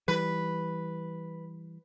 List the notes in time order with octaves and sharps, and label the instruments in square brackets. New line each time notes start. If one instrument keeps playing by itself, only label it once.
[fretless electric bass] E3 G3 [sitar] B4